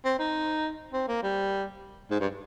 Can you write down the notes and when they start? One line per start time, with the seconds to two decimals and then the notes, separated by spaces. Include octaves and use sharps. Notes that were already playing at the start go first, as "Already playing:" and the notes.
0.05 C4
0.19 D#4
0.93 C4
1.08 A#3
1.23 G3
2.11 G#2
2.20 G2